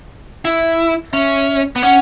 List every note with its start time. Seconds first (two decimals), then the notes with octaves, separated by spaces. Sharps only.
0.45 E4
1.13 C#4 E5
1.76 B3
1.83 C#4 F#5